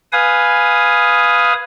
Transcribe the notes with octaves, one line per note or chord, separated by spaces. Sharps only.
B4 F5 G#5 D#6